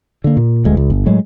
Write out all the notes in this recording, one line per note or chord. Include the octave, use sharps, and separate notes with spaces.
D3 A#3
A#2
D#1 D2 G#3
C#2
G1
A2 F#3 G#3